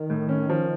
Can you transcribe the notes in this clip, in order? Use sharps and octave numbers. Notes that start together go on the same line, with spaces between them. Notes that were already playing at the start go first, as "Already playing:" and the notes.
Already playing: D#3
A2
C#4
F3